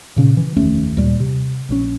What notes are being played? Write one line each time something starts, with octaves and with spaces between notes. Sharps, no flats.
A#2 C#3 C#4
E3
F1 D#2 A3 C#4
D#2 A#2 G3
C3
A#1 C#3 C#4